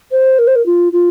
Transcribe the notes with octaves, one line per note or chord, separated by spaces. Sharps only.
C5
A#4
C5
A#4
F4
F4